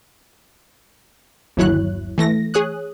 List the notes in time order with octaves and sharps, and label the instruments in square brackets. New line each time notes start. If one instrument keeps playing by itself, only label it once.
[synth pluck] G1 D#2 F#3 E4 C#5 F#6
E3 A3 A#6
G#4 C#5 D#6 F#6